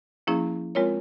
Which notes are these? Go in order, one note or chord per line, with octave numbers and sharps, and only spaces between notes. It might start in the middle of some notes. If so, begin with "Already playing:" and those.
F3 A#3 C#4 E4 G#4
G#3 C4 F4 A#4 C#5